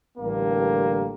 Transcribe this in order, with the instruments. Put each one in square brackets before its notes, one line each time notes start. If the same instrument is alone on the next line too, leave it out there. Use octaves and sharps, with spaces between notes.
[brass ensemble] A1 G2 D3 A#3